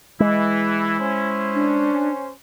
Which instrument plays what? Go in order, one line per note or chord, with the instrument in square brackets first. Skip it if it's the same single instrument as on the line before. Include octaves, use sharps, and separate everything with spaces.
[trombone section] E3 [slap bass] G#3 [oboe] E4
[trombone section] C#4 C5
[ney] D4